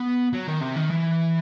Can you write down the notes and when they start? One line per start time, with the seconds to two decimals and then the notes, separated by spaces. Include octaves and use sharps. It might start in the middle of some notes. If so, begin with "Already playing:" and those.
Already playing: B3
0.33 F#3
0.47 D#3
0.61 C3
0.76 D#3
0.91 E3